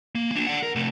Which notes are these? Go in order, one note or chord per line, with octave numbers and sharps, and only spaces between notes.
A#3
A#3 D4
D5 F#5
A#4
C3 A3